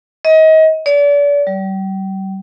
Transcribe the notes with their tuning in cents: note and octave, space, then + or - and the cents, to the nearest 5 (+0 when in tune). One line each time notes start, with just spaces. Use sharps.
D#5 +30
D5 -35
G3 -35